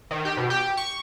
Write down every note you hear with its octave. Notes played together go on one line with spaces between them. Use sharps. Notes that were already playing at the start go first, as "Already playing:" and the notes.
D#3
G4
B2
G4
C#6